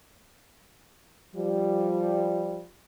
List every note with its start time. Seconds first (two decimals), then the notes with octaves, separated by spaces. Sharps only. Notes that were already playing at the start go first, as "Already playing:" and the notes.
1.35 F3 G3